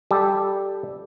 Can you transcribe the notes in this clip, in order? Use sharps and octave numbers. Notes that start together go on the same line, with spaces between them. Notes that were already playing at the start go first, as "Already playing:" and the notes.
G3 G4 A4